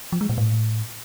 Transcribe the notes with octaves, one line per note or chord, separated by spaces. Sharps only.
F3
G#3
A#2
A2